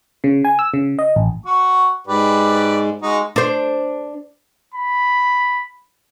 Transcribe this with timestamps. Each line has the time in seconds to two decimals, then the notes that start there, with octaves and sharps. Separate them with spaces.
0.24 C#3
0.45 G#5
0.59 E6
0.74 C#3
0.99 D#5
1.16 A1
1.46 F#4 C#6
2.07 G#2 G4 B4 D5
3.02 G#3 D#4 F#4
3.36 D4 C5
4.74 B5